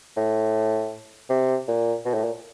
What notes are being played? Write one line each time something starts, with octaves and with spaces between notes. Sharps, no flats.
A2
C3
A#2
B2
A2
A#2